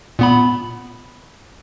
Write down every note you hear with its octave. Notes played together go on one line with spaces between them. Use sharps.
A#2 B3 B5